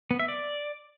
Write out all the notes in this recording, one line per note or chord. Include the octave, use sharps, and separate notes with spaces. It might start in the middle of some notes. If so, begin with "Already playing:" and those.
B3
E5
D5